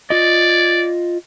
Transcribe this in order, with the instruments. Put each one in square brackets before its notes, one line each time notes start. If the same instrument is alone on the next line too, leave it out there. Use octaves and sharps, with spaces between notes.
[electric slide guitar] F4 D#5 [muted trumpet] D5